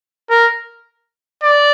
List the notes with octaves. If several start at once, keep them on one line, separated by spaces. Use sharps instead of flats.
A#4
D5